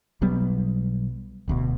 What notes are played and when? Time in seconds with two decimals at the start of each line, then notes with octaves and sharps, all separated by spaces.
0.21 B1 F#3 G3 B3
1.48 D1 D2 B2